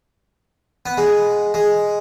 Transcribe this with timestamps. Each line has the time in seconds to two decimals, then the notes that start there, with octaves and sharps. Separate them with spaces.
0.86 B3
0.97 G#3
1.54 G#3